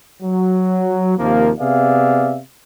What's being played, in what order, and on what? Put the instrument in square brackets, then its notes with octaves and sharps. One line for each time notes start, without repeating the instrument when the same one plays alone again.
[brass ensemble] F#3
D#2 C3 F3 A#3
C3 B3 G#4 D5 E5 F5